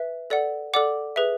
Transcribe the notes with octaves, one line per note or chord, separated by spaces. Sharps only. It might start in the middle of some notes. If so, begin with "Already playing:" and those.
Already playing: B4 E5
A4 D5 F#5
A4 D5 F#5 D6
G#4 B4 E5